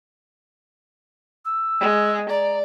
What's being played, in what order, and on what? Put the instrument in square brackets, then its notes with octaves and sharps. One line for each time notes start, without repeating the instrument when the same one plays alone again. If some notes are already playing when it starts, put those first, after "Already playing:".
[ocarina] E6
[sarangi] G#3
[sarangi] D5 [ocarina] A#5